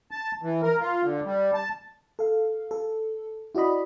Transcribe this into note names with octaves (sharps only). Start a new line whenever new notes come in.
A5
E3
A#4
F4
D3
G3
A5
A4 F5
A4
E4 F#4 D5 D#5 B5